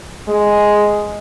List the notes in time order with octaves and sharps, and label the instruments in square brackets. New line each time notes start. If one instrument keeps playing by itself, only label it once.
[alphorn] G#3